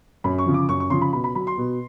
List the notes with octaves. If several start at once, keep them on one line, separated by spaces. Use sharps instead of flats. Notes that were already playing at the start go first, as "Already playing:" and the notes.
F#2 B5
C#6
C#3 F3
D6
F#2 C#6
C#6
C#3 F3 C6
B5
B2 B5
B5
F#3 B5
C6
B2